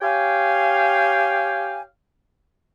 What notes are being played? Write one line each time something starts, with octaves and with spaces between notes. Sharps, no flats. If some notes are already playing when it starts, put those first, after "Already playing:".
G4 C#5 F5 G5 G#5